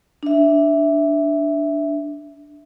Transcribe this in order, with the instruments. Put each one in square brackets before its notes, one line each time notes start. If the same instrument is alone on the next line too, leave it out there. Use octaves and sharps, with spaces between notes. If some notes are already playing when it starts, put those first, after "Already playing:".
[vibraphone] D4 E5